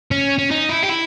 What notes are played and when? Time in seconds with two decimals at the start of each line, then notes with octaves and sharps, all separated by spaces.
0.11 C#4
0.38 C#4
0.51 D#4
0.69 E4
0.83 G4
0.90 E4